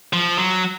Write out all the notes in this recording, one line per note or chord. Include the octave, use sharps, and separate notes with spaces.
F3
F#3